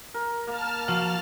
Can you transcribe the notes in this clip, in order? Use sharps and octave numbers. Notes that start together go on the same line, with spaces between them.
A#4
A#3 A5 F6
F3 F#4 F5